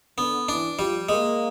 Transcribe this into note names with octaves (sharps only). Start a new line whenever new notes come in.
D3 B3
E3 D4
F3 G3
G#3 A#3